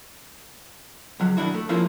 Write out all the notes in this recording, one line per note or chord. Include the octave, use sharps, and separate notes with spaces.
C#2 F#3
B2 D#3 D4 E4 F#4
A3
F3 G#3 A#3 C#4 E4 F4